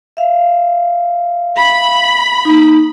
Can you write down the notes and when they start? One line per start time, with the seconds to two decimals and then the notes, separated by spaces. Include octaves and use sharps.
0.17 E5 F5
1.57 B5
2.45 A#3 D#4